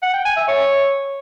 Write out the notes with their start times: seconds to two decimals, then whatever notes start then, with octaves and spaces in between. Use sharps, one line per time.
0.02 F#5
0.14 G5
0.25 G#5
0.36 E5
0.48 C#5